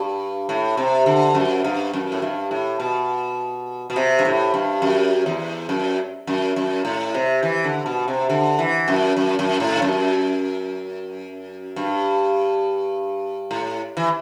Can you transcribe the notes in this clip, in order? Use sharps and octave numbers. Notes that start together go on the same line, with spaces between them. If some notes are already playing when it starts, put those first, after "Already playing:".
Already playing: G2
A2
C3
D3
F#2
G2
F#2
A2
G2
A2
B2
B2
C3
G2
A2
G2
F#2
E2
F#2
F#2
F#2
A2
C3
E3
D3
B2
C3
D3
E3
F#2
F#2
F#2
A2
G2
F#2
G2
A2
E3